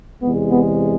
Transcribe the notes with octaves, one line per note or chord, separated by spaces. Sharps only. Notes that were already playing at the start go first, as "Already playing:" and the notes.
E2 C3 G#3 B3
B3